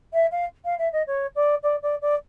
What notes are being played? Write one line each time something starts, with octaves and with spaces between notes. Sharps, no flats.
E5
F5
F5
E5
D#5
C#5
D5
D5
D5
D5